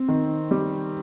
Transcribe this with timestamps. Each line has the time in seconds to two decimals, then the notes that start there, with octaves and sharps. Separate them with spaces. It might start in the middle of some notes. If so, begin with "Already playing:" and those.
Already playing: C4
0.09 D#3
0.51 G3